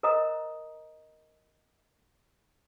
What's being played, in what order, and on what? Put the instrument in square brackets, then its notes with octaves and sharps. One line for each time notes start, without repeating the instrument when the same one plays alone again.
[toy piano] A#4 C5 D#5 A#5 D#6